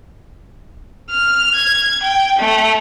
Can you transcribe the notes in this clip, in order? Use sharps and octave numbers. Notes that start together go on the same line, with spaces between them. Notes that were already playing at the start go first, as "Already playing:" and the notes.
F6
G#6
G5
A3